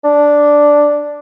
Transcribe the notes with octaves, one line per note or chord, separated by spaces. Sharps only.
D4